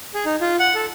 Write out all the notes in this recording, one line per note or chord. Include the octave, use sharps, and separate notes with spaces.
G#4
D#4
F4
F#5
A4